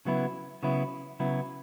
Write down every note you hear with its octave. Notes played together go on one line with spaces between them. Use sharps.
C#3 F#3 B3 E4
C#3 F#3 B3 E4
C#3 F#3 B3 E4